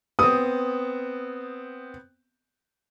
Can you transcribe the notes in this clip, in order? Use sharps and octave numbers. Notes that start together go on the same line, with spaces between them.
B3 C4 D#6